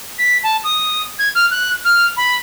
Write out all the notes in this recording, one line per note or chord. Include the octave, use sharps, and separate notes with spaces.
B6
A5
D#6
G#6
F6
F#6
F6
B5